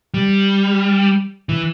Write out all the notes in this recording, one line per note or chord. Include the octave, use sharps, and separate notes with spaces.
G3
E3